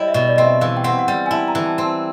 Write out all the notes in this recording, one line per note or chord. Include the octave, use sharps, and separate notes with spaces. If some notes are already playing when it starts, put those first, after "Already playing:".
Already playing: G3 E4 C#5 D#5
E5
B2
D5
C4 D#5
E5
E3 F5
G5
C4 F#5
F#5
G3 G5
G#5
E4 A5
A#5
E3
A5
C4
A5